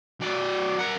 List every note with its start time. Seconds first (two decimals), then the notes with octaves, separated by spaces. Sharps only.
0.21 F#3 D5
0.79 A#4 F#5